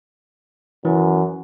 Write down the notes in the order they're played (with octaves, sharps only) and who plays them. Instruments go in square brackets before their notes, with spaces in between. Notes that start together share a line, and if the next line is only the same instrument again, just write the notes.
[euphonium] F#2 [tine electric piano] E3